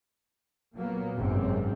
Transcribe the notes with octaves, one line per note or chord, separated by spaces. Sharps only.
A#2 F#3 A#3 B3
G#1 F#2 C3 C4